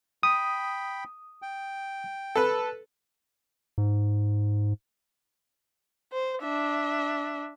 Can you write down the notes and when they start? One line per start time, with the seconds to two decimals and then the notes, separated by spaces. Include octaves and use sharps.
0.23 G5 B5 D#6
1.42 G5
2.35 A4 B4
3.78 G#2
6.13 C5
6.42 D4 E5